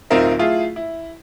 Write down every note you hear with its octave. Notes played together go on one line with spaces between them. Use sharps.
D1 C4 D#4 F4 A#4 E5
A3 E4 F4 G#4
E4